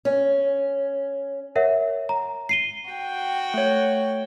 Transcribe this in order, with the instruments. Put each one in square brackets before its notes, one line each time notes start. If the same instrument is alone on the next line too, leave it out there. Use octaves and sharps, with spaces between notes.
[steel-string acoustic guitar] C#4
[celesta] A#4 C#5 E5 F#5
A#5
C7 D#7 G7
[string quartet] F#4 G5
[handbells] A3 C#5